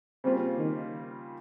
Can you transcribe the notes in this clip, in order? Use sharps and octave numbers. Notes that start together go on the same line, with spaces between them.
C#3 G3 A#3 C4 F4
D#3